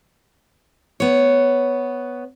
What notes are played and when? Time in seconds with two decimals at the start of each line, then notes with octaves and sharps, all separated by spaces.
1.00 B3 C#5